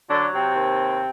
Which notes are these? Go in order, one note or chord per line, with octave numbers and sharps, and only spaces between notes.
D3 F#3 D4
C3 C4
D#2